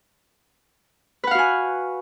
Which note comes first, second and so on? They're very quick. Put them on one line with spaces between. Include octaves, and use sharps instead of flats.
B4 F#5 F5 F#4 G#5